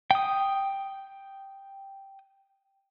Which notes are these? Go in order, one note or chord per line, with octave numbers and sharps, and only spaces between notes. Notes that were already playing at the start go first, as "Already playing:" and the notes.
G5 D#6